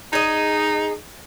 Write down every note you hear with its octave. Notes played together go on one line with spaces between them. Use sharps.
D#4 G#4 D#5